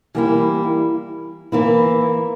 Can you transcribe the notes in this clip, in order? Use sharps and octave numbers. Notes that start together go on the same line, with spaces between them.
E3 G3 A#3 E4
E3 A#3 E4